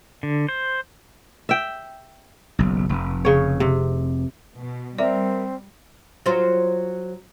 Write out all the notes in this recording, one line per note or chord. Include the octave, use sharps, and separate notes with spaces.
D3
C5
E5 G5
F#1 B1
F1
C#3 C#5
C3
B2
G3 C4 A#4 D5 E5
F#3 F4 C5